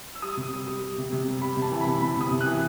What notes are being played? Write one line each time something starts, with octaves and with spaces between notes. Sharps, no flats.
E6
G3 D#6
C3
G3
G3
G3
C3
C3
G3
G3 B5
C3
A5
E3
B5
C3
C3 B5
C3 D#6
C3
F#6
E3